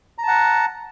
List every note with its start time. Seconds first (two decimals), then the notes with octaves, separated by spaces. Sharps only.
0.18 A#5
0.23 A5
0.28 F#5